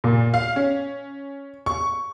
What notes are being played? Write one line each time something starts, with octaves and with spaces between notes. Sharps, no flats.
A#2
F5
C#4
C#6